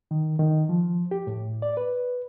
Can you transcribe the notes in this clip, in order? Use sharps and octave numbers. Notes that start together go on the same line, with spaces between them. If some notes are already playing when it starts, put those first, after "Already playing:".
D#3
D#3
F3
G4
A2
D5
B4